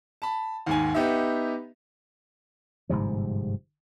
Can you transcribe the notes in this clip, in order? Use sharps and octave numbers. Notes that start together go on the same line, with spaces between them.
A5 B5
D#2 G#2 G#5
B3 D#4 G4 E5
G1 G#2 C3 F3